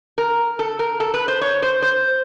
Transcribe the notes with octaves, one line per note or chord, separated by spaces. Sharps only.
A#4
A4
A#4
A4
B4
C5
C#5
C5
C5